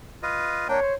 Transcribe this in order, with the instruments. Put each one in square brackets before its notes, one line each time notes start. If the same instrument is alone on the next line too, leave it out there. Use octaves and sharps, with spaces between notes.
[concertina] F4 B4 D#5
[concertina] A#3 D4 G5 [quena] C#5
[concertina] C5